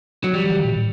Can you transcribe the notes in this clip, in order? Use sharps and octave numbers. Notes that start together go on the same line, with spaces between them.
F#3
F3 G3
E3
D#3
A#2
A2